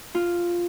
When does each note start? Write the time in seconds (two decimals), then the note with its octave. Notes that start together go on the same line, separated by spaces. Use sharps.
0.15 F4